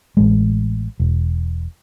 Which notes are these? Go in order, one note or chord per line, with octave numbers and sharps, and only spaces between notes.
A1 G#3
E1